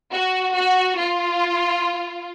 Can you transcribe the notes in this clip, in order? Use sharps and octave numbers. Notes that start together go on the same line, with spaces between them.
F#4
F#4
F4